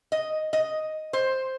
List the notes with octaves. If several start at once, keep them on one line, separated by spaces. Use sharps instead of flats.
D#5
D#5
C5